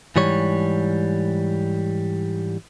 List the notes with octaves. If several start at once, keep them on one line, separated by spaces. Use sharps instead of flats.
G#2 E3 G3 C#5